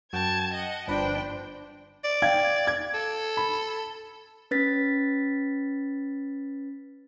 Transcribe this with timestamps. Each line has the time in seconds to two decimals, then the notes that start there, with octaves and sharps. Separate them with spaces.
0.13 F#2 F#4 G5 A5 G#6
0.53 D#5 F#5
0.88 G1 F3 D4 B4 C5 G5
2.04 D5
2.22 F5 G5 G#6
2.67 G#6
2.94 A4
3.37 B5
4.51 C#4 B4 A6 B6